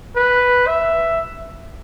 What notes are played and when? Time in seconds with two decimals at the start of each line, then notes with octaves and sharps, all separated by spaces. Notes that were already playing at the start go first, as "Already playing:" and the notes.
0.16 B4
0.67 E5